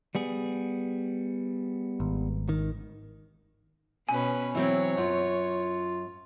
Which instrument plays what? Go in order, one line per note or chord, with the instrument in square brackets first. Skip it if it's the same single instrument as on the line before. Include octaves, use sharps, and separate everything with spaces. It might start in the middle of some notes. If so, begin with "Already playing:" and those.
[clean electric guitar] G3 B3 G#4
[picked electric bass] G#1
[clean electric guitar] D#3
[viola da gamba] B2 C#4 B4 [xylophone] G#5
[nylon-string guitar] E3 F#3 C4 [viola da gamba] C#5
[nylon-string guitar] F#2 [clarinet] F4